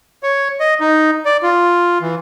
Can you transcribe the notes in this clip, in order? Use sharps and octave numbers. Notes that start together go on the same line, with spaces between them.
C#5
D#5
D#4
D5
F4
E3